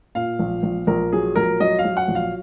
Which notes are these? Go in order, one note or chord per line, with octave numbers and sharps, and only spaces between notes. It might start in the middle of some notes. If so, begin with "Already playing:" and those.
A#2 F5
A#1
A#1
A#1 A#4
F#3 G#4
A#1 A#4
F#3 D#5
F5
F#3
F#5
A#1
F5